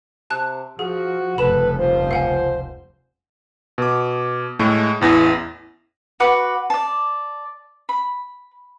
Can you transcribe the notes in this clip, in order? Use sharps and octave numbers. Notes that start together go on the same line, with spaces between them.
C3 A5 F#6
F3 F#4 G#4
F1 C#2 G2 A4 B4 B5 E7
F3 C5
F5 F#5 G#5
B2 D6
A2 G#3 A3
A1 E2 E4 A#6
F#4 B4 F#5 D6
D5 A5
B5